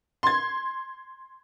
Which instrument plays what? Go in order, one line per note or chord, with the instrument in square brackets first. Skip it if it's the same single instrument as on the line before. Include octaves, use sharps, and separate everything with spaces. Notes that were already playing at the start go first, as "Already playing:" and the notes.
[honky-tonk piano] C6 G#6